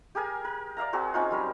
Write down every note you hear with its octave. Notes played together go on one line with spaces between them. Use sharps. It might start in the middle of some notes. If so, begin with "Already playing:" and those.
G4 G#4 A#4 G#5
A#4
D5 E5 F5 A#5
C4 F#4 G#4
C4 C#4 D#4 F4
F#3 G3 A#4